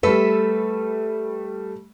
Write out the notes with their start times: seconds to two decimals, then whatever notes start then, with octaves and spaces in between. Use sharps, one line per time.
0.03 G3 A3 A4 B4 E5